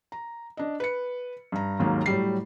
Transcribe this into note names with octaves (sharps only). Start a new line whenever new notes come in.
A#5
D4 D#5
B4 C#7
G2 A#5
D#2 G#2 D#3 F#3 A#3
A2 F#3 G3 C7